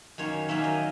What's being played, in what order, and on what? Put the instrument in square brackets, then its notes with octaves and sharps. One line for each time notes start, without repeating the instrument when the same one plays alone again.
[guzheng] F#2 D#3 A#3 C#4 C#5
F#2 D#3 A#3 C#4 E5
D#5